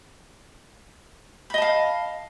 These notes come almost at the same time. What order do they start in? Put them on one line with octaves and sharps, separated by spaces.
B5 D#5 A5 F5